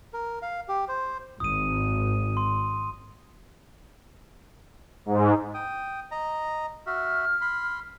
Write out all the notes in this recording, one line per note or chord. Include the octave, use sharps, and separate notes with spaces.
A#4
F5
G4
C5
G#1 D#6 D#7
C6
G#2
G5 D#6
D#5 A#5
F#4 E5 F6
B5 C6